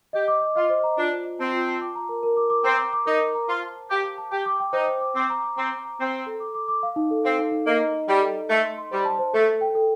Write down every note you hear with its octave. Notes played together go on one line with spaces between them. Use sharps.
G4 D#5
D6
D#5
F4 D#5
C5
A#5
D4 F4
C5
D#5
C4 A5
F4
A5
D6
A#5
A#4
A#4
D6
D6
C4 A#5
D6
D6
D#4 A#4
A#4
A#5
F4 C5
A5
A5
G4 F5
D6
A5
G4 G5
D6
G5
D#4 C5
C5
D6
C4 D6
A#5
D6
C4 A#5
A#5
A#5
C4 A#5
A#5
A4
D6
D6
D6
F5
D#4
A4
C4 F5
D#4
D#4
A#3 D#5
A#5
D#4
G3 D#4
A4
D#4
A3 D#5
C6
C6
G3 C5
A5
C5
A3 A4
A4
G5
A4